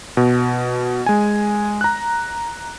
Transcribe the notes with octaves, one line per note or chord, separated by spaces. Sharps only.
B2
G#3 G#5
A#5 F#6